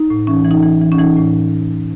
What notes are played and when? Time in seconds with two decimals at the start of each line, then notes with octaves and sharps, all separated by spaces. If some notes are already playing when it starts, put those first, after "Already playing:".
Already playing: D#4
0.10 A2
0.27 E3 C#4
0.45 E3
0.51 D#4
0.63 E3
0.81 E3
0.92 C#4
0.99 E3 D#4
1.16 A2